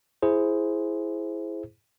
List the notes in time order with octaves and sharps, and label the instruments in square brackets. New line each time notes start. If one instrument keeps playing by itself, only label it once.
[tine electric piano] E4 G#4 C5